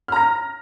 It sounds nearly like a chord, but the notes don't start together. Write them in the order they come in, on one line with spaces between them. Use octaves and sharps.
F6 A#5 A#6